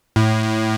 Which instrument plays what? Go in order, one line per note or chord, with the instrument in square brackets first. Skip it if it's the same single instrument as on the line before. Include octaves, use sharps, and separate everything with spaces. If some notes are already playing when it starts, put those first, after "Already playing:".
[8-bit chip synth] A2